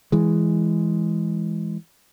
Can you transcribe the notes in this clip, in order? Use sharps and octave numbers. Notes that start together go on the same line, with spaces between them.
E3 G#3